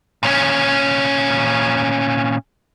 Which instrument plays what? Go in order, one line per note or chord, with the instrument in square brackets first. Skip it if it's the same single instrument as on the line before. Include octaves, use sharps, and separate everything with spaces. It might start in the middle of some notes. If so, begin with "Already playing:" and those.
[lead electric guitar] A#2 C#4